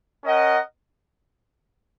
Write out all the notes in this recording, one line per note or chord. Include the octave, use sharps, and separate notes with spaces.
C#4 A#4 D#5 F#5